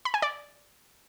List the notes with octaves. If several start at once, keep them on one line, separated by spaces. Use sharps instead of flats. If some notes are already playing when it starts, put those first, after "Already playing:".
B5
G#5
D5